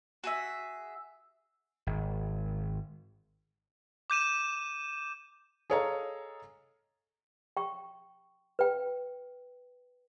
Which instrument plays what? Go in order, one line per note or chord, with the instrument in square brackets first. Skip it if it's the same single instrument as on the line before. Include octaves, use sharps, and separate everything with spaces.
[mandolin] F#4 G#4 E5
[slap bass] G#1
[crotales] D6 G6 D#7 E7
[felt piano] G#4 A4 C#5 D#5 F5 A#5
[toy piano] G5 C#6
B4 G5